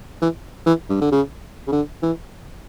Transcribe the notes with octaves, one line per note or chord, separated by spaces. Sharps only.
E3
E3
G2
D3
C#3
C#3
D3
E3